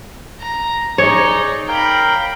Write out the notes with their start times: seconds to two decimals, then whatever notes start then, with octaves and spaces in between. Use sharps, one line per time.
0.41 A#5
0.98 D#4 G#4 C#5 D5 A#5
1.69 A#4 F5 G5 A#5 B5